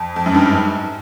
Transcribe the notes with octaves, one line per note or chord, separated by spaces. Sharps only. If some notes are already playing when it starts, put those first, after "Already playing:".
Already playing: F2
F2
F#2
G2
G#2